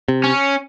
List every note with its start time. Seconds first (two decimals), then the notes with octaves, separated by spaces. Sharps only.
0.08 C3
0.24 C#4